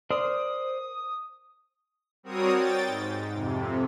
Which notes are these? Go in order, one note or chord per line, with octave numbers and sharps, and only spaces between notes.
A#4 C5 D5 D#6
G3 C4 F#4 A#4 C#5 D#6
G5 A6
G#2
F2 C3